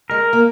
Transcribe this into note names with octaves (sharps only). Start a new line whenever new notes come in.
G#3 A#4
A#3